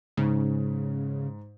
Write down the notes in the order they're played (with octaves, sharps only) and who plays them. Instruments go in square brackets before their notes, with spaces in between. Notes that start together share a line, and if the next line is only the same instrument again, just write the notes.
[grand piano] G#2 [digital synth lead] C#3